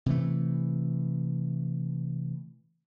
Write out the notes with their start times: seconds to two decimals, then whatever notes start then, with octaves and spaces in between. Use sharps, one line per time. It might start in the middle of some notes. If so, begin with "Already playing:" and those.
0.06 C3 E3 A3